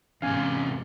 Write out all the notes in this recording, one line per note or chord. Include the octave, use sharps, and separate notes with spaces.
E2 G#2 C3 C#4 F5 G#5